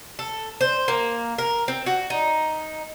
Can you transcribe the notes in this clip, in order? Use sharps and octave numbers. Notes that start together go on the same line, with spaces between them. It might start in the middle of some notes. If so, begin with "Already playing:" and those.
A4
C5
A#3
A#4
C4
F#4
D#4